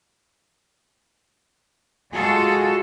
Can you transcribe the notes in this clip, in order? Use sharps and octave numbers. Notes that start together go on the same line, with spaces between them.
G#3 F4 F#4 G#4 A4